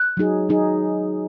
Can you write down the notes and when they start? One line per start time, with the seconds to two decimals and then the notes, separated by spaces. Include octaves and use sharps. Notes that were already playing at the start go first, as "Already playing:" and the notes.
Already playing: F#6
0.17 F#3 D#4 G#4
0.49 F#3 D#4 G#4